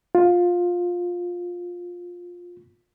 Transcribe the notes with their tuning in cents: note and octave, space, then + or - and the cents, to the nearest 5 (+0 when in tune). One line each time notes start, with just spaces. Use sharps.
F4 +15